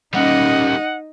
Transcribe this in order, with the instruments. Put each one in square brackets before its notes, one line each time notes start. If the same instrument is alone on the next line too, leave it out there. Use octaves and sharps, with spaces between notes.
[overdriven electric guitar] G3 A#3 [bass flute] C#4 [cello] D#4 D#5 [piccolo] F#5